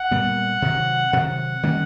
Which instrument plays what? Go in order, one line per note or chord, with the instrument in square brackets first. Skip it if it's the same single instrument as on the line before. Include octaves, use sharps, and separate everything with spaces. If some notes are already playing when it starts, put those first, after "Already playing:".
Already playing: [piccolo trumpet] F#5
[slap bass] A#2 G3 B3
C3 D#3 F#3
[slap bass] C3 D#3 F#3 [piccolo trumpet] F#5
[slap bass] D#3 G3 A#3 C#4